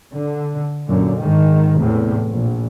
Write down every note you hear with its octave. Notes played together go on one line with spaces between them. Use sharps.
D3
F#2 A#2 D3
G#2 D#3
E2 A2 C3
A#1